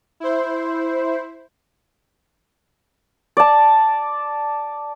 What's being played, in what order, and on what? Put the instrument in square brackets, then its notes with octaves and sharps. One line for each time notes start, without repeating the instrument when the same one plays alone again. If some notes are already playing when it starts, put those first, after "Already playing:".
[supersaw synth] E4 C5
[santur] D5 A5